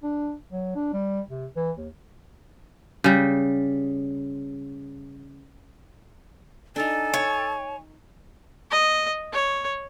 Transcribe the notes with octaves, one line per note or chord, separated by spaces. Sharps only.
D4
F#3
D4
G3
C3
E3
D#2
C#3 G3
D4 D#4 A4 G#5
C#5 A5 C#6
D#5
C#5